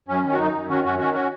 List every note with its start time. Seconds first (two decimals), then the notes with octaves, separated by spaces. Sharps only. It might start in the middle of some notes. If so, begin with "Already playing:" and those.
0.08 F#2 C#4
0.24 D#3
0.33 F#4
0.38 F#2 D#4
0.53 F#2
0.69 D#3 C#4 F#4
0.84 F#2 C#4 F#4
0.99 D#3 C#4 F#4
1.14 C#4 F#4